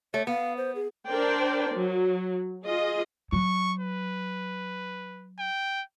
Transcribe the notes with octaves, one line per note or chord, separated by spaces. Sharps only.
A3 C#5
B3 F5
C5
G#4
D4 A#4 C5 D5 G5
F#3
F4 G#4 D#5
F#3 C#6
B4
G5